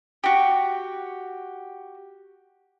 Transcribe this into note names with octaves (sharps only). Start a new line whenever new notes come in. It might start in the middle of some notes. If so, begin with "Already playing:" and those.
F#4 G4